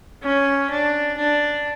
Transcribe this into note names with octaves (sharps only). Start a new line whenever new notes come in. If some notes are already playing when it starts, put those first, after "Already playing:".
C#4
D4
D4